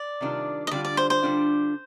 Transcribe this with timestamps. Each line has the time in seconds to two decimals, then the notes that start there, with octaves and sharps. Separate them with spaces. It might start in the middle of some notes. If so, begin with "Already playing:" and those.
Already playing: D5
0.21 C3 D#3 G3 D4 F4
0.67 D#5
0.71 D3 G3 D4 F4 D5
0.85 D5
0.97 C5
1.10 C5
1.22 D3 G3 D4 F4